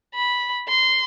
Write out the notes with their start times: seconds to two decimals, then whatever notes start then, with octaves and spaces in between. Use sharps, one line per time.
0.15 B5
0.68 C6